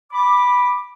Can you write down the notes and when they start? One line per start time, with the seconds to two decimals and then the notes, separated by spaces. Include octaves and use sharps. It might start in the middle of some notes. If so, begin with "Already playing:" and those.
0.12 B5 D6